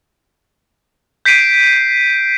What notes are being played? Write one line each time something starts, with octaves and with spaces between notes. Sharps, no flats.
G6 B6 C7 D7 D#7